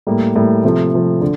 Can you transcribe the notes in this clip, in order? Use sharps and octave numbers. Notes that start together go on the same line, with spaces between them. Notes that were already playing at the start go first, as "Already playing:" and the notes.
A2 G3 A#3
A2 G3 A#3
C3 F3 A3
C3 F3 A3
D3